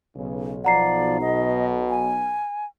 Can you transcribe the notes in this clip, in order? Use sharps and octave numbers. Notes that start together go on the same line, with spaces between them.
B1 C#3
F3 D5 F#5 A#5 C7
B2 D#5
G#5